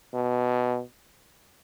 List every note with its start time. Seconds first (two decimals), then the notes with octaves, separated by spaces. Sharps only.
0.14 B2